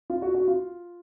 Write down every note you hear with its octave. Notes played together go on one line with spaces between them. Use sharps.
F4
F#4
F#4
F4